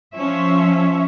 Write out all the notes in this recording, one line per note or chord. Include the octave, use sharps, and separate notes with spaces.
F3 C#4 E5